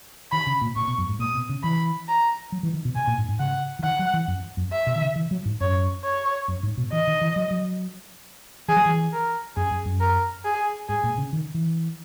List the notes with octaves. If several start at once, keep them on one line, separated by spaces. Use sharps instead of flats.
D#3 B5
C#3
A#2
A#2 C#6
B2
F#2
G#2
A#2 D#6
B2
C#3
E3 B5
A#5
F#3
E3
D#3
B2
B2 G#5
A#2
G#2
G#2
C#3 F#5
E3
D#3 F#5
F#3
E3
F#2
F#2
E5
B2
D#3
C#3
E3
F#3
G#2
F#2 C#5
C#5
F#2
G#2
B2
E3 D#5
D#3
E3
F#3
F#3
E3 G#4
F#3
E3
A#4
F#2 G#4
F#2
F#2
A#4
G#4
G#2 G#4
A#2
C#3
D#3
E3